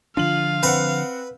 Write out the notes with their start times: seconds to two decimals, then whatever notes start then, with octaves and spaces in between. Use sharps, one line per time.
0.17 D3 F3 D4 F4 F5 F#7
0.63 C4 B4 F#5